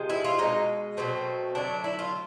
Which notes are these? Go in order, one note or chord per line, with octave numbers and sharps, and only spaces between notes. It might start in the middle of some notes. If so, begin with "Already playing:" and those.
Already playing: C3 F3 G#3
E4
F4
B2 G#3 D#4
B2 F#3 A3 C4
D3 F#3 A3 D4
E4
F4